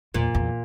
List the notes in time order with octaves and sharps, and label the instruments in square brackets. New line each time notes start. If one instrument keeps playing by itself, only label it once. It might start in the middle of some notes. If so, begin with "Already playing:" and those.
[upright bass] E2 [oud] A#2
[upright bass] E2